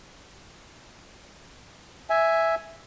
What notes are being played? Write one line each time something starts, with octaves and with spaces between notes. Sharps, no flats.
E5 G#5